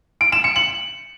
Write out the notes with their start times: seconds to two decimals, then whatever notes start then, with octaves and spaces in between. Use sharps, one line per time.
0.21 D7
0.32 E7
0.44 C#7
0.56 F#7